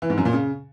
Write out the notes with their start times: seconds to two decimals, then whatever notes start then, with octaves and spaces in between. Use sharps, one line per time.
0.02 E3
0.10 G#2
0.18 F#2
0.25 A#2
0.33 C#3